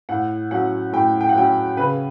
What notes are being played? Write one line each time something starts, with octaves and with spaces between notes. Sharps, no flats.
A2 F#5
F#3 C#4 F#5
A2 G5
G5
F#5
F#3 C#4 G5
C#3 B4